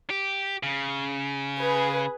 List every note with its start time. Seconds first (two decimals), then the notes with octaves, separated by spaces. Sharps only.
0.10 G4
0.63 C#3
1.59 G#4 B4